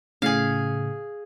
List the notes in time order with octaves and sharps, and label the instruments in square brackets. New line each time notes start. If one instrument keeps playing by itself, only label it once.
[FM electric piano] A2 C#3 [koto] G#4 F5